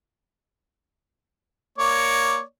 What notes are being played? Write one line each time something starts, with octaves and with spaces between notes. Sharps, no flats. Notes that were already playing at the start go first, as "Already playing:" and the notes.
A#3 C#5 D5